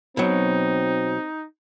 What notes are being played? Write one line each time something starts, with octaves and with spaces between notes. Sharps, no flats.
B2 F#3 C4 D#4